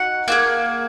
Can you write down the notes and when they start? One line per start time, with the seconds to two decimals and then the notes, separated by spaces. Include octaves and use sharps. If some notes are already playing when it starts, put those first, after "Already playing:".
Already playing: D#4 F#4 F#5
0.28 A#3 F4 G#4